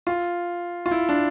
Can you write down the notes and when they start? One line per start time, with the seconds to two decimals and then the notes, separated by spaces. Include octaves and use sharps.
0.07 F4
0.86 F4
0.91 E4
1.09 D4